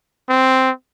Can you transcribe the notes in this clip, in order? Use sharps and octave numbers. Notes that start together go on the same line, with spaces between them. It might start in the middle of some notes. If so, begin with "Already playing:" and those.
C4